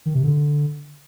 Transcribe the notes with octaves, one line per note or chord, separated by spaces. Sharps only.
D#3
C3
D3